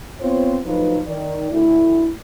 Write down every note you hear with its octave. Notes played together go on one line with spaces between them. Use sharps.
B3 C4 F4 C5 C#5
D2 F3 F#3 D#4 B4
D#3 D5
D2 E4